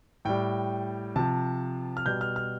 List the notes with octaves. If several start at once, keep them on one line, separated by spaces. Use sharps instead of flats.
A2 G3 G5
C3 F3 A5
F6
B2 G3 G6
F6
F6